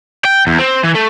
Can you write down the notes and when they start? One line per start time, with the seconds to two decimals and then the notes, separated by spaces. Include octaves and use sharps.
0.25 G5
0.47 E2
0.59 C4
0.84 E3
0.95 A3